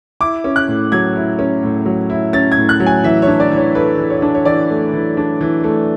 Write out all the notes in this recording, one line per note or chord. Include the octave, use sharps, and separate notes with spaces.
E4 D6
C#4
F#6
A2
F#3 G#6
E4
C#4
A2
F#3
E4
C#4 A6
G#6
A2
F#6
F#3
G#5
E3 E5
D4 C#5
D5
E3
C#5
A3 B4
E3
C#5
D4
C#5
E3 D5
A3
E3
D4
E3
A3